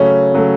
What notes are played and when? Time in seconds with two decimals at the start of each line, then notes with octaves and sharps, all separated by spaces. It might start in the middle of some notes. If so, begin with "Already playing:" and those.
Already playing: C#3 F#3 A3 C#4
0.34 C#3 F#3 A3